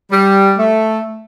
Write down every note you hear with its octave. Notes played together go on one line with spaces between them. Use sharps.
G3
A3